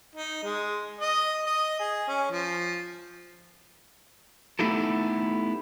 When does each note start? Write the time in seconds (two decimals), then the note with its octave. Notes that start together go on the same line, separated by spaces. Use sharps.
0.16 D#4
0.44 G#3
0.99 D#5
1.46 D#5
1.79 G#4
2.08 C#4
2.31 F3
4.59 A3 B3 D#4 E4 G4 A4